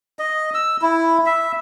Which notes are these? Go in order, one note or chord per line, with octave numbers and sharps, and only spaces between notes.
D#5
E6
E4
E5